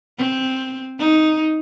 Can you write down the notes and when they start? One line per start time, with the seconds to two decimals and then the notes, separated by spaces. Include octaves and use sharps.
0.18 C4
0.99 D#4